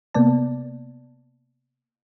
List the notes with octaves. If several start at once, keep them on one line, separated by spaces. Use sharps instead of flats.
C3 A#3 B3 D5 A5